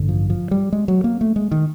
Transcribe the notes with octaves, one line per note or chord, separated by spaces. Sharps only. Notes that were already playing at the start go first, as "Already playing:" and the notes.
Already playing: A1 G2 D3
F3
F3
G3
G#3
F#3
A#3
A3
G#3
D#3